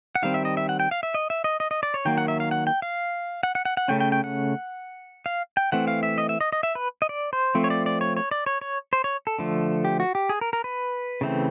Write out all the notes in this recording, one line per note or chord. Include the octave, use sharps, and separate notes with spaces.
F#5
D#3 G3 C4 F5
E5
D#5
E5
F#5
G5
F5
E5
D#5
E5
D#5
D#5
D#5
D5
C#5
D#3 F#3 A#3 G5
F#5
E5
F5
F#5
G5
F5
F#5
F#5
F#5
F#5
C#3 F3 A3 C#4 G5
G5
G5
F#5
F5
G5
E3 A3 C4 F#5
F5
E5
D#5
E5
D#5
D#5
E5
B4
D#5
D5
C5
F3 A3 C4
C#5
D5
D5
C#5
C#5
D5
C#5
C#5
C5
C#5
A4
D3 F3 A3
G4
F#4
G4
G#4
A#4
A#4
B4
C#3 E3 A3 C4